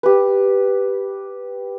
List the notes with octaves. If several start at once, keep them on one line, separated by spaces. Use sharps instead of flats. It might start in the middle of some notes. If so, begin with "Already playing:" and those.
G4 B4